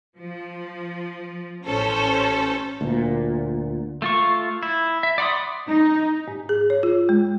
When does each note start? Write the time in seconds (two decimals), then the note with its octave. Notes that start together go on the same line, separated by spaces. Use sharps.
0.17 F3
1.66 A1 C#4 A4 C5
2.81 D2 A#2
4.02 A3 F4 C#6
4.63 E4
5.03 E5
5.18 D5 F#5 B5 C6 D#6
5.66 D#4
6.28 G#2
6.49 G#4
6.70 C#5
6.83 F4
7.09 G#3